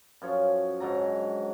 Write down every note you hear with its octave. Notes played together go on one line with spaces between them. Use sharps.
F#2 F3 C#5
G#2 D3 F#3 A#5